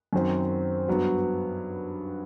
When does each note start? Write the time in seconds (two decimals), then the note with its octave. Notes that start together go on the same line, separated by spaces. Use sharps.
0.13 F#2 D#3 F#3 C4
0.88 G2 F#3 B3 F#4